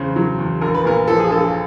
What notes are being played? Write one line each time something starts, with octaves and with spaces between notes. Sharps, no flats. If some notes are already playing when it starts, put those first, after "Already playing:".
Already playing: E2 C#3 C5
F#3
E2
A#1 A#4
B4
A#2 A#4
F3 A4
G#4
A#1 A4